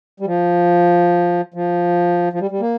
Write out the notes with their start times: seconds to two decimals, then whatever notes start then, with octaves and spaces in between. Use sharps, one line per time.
0.20 G3
0.26 F3
1.54 F3
2.33 F3
2.41 G3
2.51 G3
2.61 A#3